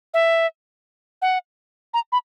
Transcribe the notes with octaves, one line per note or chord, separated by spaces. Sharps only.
E5
F#5
A#5
B5